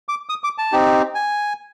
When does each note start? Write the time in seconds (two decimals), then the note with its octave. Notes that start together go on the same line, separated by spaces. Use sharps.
0.09 D6
0.29 D#6
0.44 D6
0.58 A5
0.72 C4 D#4 G4
1.15 G#5